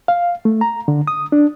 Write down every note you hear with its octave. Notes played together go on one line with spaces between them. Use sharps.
F5
A3
A#5
D3
D#6
D4